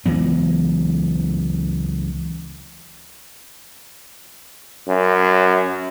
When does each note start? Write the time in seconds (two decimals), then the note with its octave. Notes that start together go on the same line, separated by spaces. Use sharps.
0.06 C#2 E3 F#3 B3
4.88 F#2